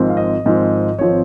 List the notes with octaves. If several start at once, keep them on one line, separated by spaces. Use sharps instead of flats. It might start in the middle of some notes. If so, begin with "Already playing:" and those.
Already playing: G#1 G#2 F3 C4
F5
D#5
G#1 G#2 F3 C4
G#1 F3 C4 C#5